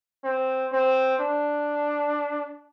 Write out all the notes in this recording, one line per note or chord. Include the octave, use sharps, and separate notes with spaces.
C4
C4
D4